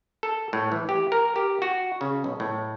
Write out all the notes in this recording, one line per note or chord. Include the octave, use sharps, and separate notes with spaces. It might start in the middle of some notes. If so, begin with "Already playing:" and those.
A4
A2
E3
G4
A#4
G4
F#4
C#3
B1
A2